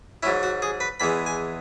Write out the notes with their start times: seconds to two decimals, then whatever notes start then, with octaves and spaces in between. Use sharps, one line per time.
0.23 G#2 F#3 C#4 E4
0.43 F#4
0.62 G#4
0.80 B4
1.00 E2 E3 G#3 B5
1.26 G#5